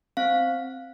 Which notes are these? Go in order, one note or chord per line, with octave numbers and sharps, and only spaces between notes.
C4 F5